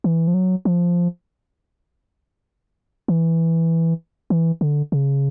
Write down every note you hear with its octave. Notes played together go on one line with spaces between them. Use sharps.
E3
F3
F#3
F3
E3
E3
D3
C#3